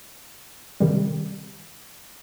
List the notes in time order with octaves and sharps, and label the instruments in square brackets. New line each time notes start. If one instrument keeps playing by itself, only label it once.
[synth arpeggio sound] C3 D#3 G3